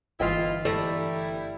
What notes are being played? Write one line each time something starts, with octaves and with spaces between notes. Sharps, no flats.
G1 E3 E4 F4 D#5 G5
G3 A3 E4 D5 A#5